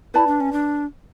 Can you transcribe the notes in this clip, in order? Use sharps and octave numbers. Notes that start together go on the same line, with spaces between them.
E4 B4 D5 A5
D4
C#4
D4